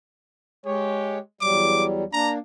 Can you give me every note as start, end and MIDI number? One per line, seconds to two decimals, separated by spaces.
0.66 1.18 56
0.66 1.21 67
0.66 1.18 73
1.41 2.04 40
1.41 2.04 54
1.41 2.04 55
1.41 1.85 86
2.13 2.38 58
2.13 2.38 62
2.13 2.34 82